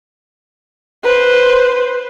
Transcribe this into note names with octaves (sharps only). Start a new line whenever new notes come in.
B4 C5